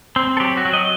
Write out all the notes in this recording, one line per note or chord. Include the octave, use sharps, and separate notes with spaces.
C4
A4
F#3 G4
F#4
F#3
D#5